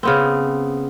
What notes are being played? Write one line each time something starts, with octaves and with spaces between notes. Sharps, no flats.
C#3 B3 C4